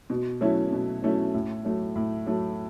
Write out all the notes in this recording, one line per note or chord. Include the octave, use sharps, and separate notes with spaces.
B2
F#3 A3 C#4 E4
B2
F#3 A3 C#4 E4
A2
F#3 A3
A2
F#3 A3